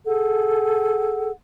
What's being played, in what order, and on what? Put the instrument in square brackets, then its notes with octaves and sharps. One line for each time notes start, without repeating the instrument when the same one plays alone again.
[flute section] G#4 A4 F#5